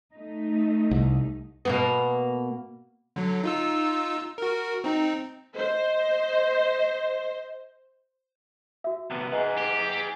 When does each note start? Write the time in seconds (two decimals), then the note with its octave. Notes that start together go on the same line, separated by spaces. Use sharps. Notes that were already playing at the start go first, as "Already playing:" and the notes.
0.14 A3 D#4
0.91 C2
1.65 B2 A#3 B3
3.16 D3 F#3
3.43 D#4 F4 E6
4.38 F#4 A#4
4.84 C4 D#4
5.55 C5 D#5
8.84 F#4 E5
9.11 C3 B3
9.32 G#4 B4 D#5 F#5 A#5
9.58 G4